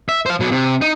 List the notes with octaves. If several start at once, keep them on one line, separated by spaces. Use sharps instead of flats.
E5
C5 F5
B2 F#3
C3
D#4